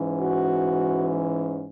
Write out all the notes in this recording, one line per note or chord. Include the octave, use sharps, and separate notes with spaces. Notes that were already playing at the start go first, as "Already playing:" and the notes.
Already playing: G#2 E3 C#4
F#4